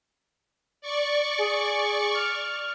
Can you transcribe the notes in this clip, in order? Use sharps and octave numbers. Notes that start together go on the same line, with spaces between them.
D5 C#6
G#4
F6